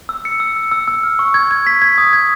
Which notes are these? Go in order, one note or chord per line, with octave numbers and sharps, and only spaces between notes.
E6
C#7
E6
E6
E6
E6
F6
C#6
G#6
G#6
B6
G#6
D#6
G#6